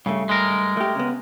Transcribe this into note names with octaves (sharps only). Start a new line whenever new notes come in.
G2 C#3 A3
G#3 A#4
A3 G4
C#3 B3